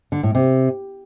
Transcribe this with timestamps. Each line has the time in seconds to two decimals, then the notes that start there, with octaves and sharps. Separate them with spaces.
0.12 D3
0.23 A2
0.35 C3